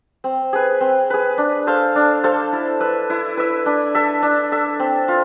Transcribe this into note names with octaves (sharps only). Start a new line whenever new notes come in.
C4
G#4 B4
C4
G#4 B4
D4
A4 C5 F5
D4
A4 C5 F5
E4
B4 E5
E4
B4 E5
D4
A4 E5
D4
A4 E5
C4
F4